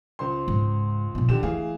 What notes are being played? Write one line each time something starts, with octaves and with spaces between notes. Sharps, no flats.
C#2 C5 C6
G#2
A#1 B2
D3 D#3 G4 E7
E3 A3 G#4 F5